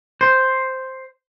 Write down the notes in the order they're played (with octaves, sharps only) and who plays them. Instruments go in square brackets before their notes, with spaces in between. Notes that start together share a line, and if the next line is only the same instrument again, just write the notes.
[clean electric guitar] C5